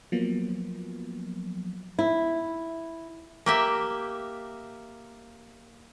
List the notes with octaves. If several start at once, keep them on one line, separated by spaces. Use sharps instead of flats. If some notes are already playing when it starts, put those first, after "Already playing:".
F3 F#3 A#3 B3
E4
A#3 G4 E5